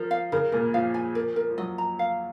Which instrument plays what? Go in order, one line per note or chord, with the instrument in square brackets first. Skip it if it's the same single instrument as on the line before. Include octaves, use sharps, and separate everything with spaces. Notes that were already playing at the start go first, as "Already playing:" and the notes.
Already playing: [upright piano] F3 [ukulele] A#4
[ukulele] F5
[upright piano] C#3 [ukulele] A#4
[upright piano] A#2 [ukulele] A#4
[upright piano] F3 [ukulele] F5
[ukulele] G#5
A#4
A#4
[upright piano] F3
[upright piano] F#3 [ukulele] D#5
[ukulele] A#5
F5